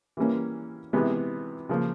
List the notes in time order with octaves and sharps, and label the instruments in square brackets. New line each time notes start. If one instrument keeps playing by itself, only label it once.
[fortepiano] E3 G3 A#3 C#4
C3 E3 G#3 B3
C#3 F3 A#3